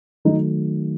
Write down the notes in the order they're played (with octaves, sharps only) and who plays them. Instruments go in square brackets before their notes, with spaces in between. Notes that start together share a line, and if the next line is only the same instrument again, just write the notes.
[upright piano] D#3 F#3 A3 D#4